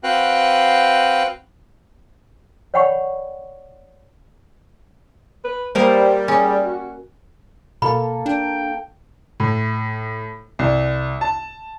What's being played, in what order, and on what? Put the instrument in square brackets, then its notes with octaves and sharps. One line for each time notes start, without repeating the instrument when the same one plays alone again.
[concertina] C4 F#4 B4 F5 G5 F#6
[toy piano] C#5 D5 F#5 G5 B5 C#6
[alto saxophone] B4
[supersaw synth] G3 [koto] A#3 A#4 D#5 [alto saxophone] C5
[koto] C#4 [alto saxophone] G#4
[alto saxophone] F#4
[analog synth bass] B2 [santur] A#3 A4 [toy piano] B5
[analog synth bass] D4 [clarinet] G5
[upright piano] A2
C2
A5